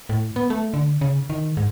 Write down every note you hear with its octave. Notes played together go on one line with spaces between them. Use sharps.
A2
B3
A3
D3
C#3
D#3
G#2